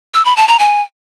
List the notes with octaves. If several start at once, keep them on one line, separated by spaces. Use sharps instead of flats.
E6
B5
A5
A#5
G#5